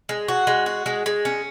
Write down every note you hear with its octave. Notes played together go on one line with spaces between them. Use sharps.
G#3
F#4
G#3
F#4
G#3
G#3
C#4